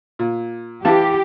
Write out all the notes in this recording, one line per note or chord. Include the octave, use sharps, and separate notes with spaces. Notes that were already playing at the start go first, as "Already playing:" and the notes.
A#2
E3 G4 F5 A5